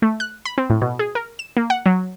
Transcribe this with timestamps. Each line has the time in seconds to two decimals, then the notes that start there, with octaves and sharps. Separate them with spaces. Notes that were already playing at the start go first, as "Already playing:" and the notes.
0.02 A3
0.20 F#6
0.45 B5
0.58 C4
0.70 A2
0.81 B2
0.99 G#4
1.15 A#4
1.39 E7
1.57 A#3
1.70 F#5
1.86 F#3